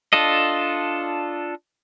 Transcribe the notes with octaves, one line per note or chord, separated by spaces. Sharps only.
D4 F4 A4 D#5